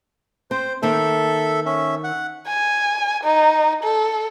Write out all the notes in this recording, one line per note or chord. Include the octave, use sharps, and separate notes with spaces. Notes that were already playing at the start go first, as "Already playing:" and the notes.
C4 C5
D#3 A#3 C4 A4 E5
C#4 E5
F#5
G#5
D#4
A4